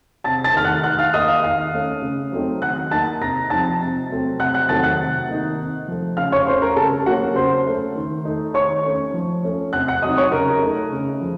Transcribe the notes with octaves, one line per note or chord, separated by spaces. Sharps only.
C3 A5 A6
A5 A6
D#3 A3 F6
F#5 F#6
D#3 F#5 F#6
F5 F6
A#3 D#4 D#5 D#6
F5 F6
D#3 F5 F6
A3 C#4
C#3
F#3 A3 C4 D#4
D#3 F#5 F#6
A#3 D#4 A5 A6
C3 A#5 A#6
F3 C4 D#4 A5 A6
C3
F#3 A3 C4
C3 F#5 F#6
F#5 F#6
D#3 F#3 A3 C4 A5 A6
F#5 F#6
C3
D#3 A#3 D#4
C3
F3 A3
C#3 F5 F6
C#5 C#6
A3 C#4 C5 C6
A#4 A#5
C#3 A4 A5
F#3 A#3 C#4 F#4 F#5
C#3 C5 C6
A3 C#4
D#3
A3 D#4
D#3 C#5 C#6
A3 C#4
F3
A3 C#4
C3 F#5 F#6
F#5 F#6
F#3 C4 D#4 D#5 D#6
C#5 C#6
C#3 A#4 A#5
A3 D#4
C#3
F3